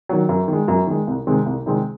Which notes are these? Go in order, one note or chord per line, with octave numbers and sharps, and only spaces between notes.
D#3 F#3
F#2
D#3 G#3
F#2
D#3 G#3
C2
C3 D#3 G#3 C4
C2
C3 D#3 G#3 C4